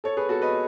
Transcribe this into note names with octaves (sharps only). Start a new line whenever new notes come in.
A4 C#5
G#4 B4
F#4 A4
B4 D#5